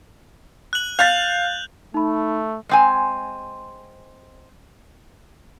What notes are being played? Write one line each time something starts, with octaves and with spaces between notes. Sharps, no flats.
F#6 F#7
F5 F#6 G6 A6 F7
A3 D#4 B5
G#3 C4 G#5